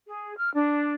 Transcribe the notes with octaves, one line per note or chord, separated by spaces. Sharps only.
G#4
F6
D4